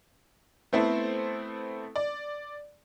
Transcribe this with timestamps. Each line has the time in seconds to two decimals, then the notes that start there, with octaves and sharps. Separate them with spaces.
0.73 A3 B3 C4 E4 A4 C5
1.96 D5